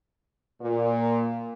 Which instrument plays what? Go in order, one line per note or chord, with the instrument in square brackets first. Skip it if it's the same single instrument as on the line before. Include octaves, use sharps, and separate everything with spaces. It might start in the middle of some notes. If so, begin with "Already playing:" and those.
[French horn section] A#2